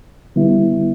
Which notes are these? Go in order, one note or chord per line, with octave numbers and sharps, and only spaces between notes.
D3 G3 B3 E4